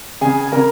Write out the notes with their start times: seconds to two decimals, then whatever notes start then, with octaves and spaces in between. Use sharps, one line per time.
0.21 C#3 G#4 G#5
0.41 G#5
0.52 C#3 A#4 A#5